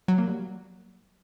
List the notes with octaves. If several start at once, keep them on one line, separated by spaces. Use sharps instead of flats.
F#3
A#3
G3